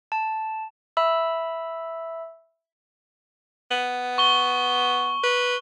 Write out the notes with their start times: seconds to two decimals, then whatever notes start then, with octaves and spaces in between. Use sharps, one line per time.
0.12 A5
0.97 E5 B5 E6
3.71 B3
4.18 C#6 G7
5.23 B4